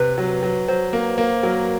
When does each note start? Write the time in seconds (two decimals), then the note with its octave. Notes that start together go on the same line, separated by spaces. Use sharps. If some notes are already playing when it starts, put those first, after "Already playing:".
Already playing: C3 B4
0.18 F#3
0.43 F#3
0.68 F#3 C5
0.93 A#3
1.18 A#3
1.43 F#3 A#4